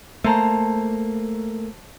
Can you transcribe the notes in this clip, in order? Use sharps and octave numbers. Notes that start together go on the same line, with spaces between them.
A3 A#3 C5 A5 A#5